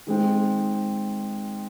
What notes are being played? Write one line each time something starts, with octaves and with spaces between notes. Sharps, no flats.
D#3 G#3 C4